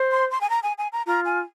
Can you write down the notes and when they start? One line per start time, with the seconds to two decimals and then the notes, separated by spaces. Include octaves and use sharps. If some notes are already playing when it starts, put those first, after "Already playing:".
Already playing: C5
0.12 C6
0.31 C6
0.41 G#5
0.50 A#5
0.63 G#5
0.78 G#5
0.92 A#5
1.06 F4 A#5
1.25 G#5